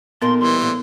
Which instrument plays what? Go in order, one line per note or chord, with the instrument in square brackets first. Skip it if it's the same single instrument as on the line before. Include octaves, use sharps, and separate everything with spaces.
[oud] A#2 D#4 A#4 [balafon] B3 [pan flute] C6
[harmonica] E3 G3 [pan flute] C6
[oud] A2 A#3 D4